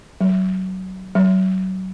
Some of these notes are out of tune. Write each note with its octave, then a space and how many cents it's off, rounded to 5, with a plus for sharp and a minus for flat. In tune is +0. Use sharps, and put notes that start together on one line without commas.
F#3 +20
F#3 +25